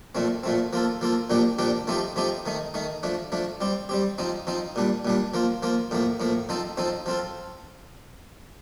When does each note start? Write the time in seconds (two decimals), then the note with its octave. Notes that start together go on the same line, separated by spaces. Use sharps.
0.15 A#2 F3 A3 C4
0.43 A#2 F3 A3 C4
0.73 F3 A#3 F4 A4
1.01 F3 A#3 F4 A4
1.30 A#2 F3 A#3 D4 G4
1.59 A#2 F3 A#3 D4 G4
1.87 F3 A3 C4 D#4 G4
2.16 F3 A3 C4 D#4 G4
2.46 D#3 A3 D#4
2.74 D#3 A3 D#4
3.03 F3 A3 D4
3.32 F3 A3 D4
3.61 G3 C4 G4
3.89 G3 C4 G4
4.18 F3 C4 D#4
4.47 F3 C4 D#4
4.76 A#2 G3 D4
5.05 A#2 G3 D4
5.34 F3 A#3 F4
5.63 F3 A#3 F4
5.91 A2 F3 A#3
6.20 A2 F3 A#3
6.49 F3 C4 D#4 A4
6.77 F3 C4 D#4 A4
7.06 F3 C4 F4 A4